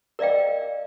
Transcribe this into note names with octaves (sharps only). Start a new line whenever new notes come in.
A#4 D5 D#5 F5 G5